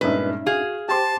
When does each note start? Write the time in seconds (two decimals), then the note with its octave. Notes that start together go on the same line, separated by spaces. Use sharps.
0.01 G2 A#2 G#3 C#4 D#4 B4 E5
0.46 F#4 G#4 F5
0.89 G4 C5 G5 A5 C6 D6